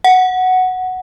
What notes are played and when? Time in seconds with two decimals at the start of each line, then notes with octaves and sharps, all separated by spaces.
0.04 F#5